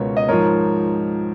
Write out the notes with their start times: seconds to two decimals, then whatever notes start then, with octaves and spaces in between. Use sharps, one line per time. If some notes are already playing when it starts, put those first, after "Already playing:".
Already playing: C#2 B2 A#4 C#5
0.17 D#5
0.28 G#2 F3 A#4 C#5